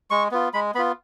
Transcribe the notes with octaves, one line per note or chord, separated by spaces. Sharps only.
G#3 C#6
B3 F4
G#3 B5
B3 F4 B5